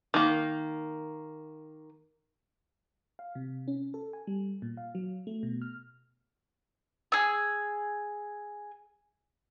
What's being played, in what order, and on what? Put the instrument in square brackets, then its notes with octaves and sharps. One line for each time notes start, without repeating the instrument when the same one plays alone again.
[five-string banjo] D#3 A#3
[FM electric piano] F5
C3
C#4
A4
G#5
G3
A#2
F5
F#3
A3
B2
F6
[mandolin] G#4 E6